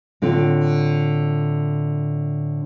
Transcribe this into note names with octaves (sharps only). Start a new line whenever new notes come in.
A2 D3 C4 F4